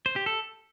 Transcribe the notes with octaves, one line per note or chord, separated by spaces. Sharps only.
C5
G4
A4